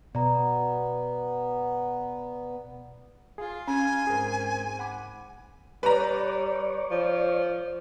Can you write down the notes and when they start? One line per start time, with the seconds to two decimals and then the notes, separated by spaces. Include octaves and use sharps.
0.15 B2 B3 D5 A#5
3.38 F4 G#4
3.67 C#4 G#5
4.07 G#2 C4 G#4 A#4
4.79 F#5 B5 D6
5.83 G3 B4 C#5 D5 A#5
6.91 F3